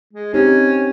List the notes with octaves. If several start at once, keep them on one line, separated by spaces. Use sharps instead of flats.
G#3
C4 C#4 D#4 G4